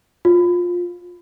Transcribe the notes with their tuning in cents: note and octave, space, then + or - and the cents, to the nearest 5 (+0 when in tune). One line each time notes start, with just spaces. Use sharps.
F4 +15